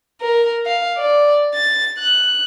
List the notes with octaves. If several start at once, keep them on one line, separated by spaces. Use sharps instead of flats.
A#4
F5
D5
A6
F#6